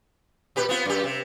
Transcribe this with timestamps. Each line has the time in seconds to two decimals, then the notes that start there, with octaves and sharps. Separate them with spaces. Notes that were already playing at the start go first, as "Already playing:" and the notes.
0.56 A#2 G4 B4
0.69 B3 C4 F4
0.85 F#2 G4
1.04 C3